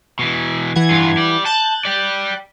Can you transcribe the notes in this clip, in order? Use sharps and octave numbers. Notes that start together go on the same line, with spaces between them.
B2 E3
E3 F#5 G#6
G2 F4
G4 D5
A5 F#6 G6 A6
D5 G5